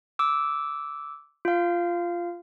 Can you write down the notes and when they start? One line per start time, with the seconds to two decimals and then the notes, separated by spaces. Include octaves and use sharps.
0.19 D6 E6
1.45 F4 F5